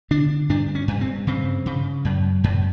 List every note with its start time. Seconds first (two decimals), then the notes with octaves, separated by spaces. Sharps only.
0.11 D3 D4
0.49 G2 D4
0.75 C#4
0.88 G2
1.01 C4
1.27 C#3 C4
1.66 C#3
2.05 F#2
2.44 F#2